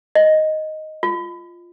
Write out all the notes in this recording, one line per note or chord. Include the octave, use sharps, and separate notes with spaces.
D#5
F4